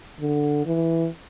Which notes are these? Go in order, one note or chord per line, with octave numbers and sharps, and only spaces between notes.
D3
E3